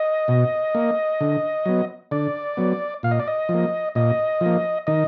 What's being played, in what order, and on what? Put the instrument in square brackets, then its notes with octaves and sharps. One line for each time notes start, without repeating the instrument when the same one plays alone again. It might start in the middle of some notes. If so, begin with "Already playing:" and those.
Already playing: [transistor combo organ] D#5
B2
A#3
D3
F#3 B3
D3 D5
F#3 B3
A#2 F5
D#5
D5
D#5
F3
A#3
A#2 D#5
F3 A#3
D#3 D#5